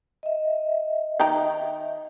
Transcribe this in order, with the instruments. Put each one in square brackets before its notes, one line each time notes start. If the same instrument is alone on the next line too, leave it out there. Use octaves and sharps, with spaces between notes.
[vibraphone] D#5 E5
[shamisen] D#3 G5 A#5